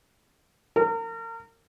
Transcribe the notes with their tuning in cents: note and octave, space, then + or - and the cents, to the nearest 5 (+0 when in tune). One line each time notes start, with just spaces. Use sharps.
A#4 -35